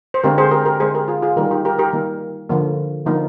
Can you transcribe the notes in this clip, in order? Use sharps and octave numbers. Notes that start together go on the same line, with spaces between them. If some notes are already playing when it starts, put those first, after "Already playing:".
C5
D3 G#3 C4 G4 A#4
G#4 C5
G4 A#4
G4 A#4
D3 G#3 C4 G#4 C5
G4 A#4
F4 G#4
F4 G#4
D#3 G3 A#3 G4 A#4
D#4 G4
G4 A#4
G4 A#4
D#3 G3 A#3
D3 F3 A#3
D3 F3 A#3 D#4